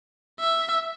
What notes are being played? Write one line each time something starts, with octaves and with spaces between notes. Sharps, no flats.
E5